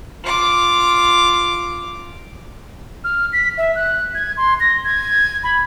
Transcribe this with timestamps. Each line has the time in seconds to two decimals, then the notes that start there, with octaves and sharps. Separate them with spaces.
0.24 F4 D6
3.04 F6
3.33 B6
3.58 E5
3.75 F#6
4.15 G#6
4.37 C6
4.60 A#6
4.84 G#6
5.43 B5